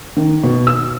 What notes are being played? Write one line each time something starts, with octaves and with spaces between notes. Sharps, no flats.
D#3
B2
E6